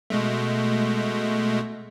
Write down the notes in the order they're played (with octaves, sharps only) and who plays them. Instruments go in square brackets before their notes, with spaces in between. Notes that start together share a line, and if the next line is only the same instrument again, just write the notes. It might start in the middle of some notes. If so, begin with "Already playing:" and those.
[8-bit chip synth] B2 G#3 A3